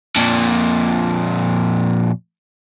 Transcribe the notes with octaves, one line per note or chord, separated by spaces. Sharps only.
F2 A#2